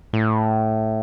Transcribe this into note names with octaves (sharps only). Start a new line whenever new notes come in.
A2